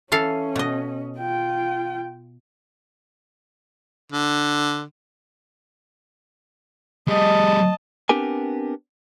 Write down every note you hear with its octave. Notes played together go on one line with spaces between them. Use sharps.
E3 C#4 A4 F5
B2 D#5
F4 G5
D3
G3 G#4 D#5 A5
B3 C4 D4 G4 A#4 G#5